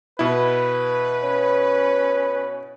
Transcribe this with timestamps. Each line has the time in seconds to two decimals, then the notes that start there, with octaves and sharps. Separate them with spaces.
0.19 B2 E4 B4
1.23 C#4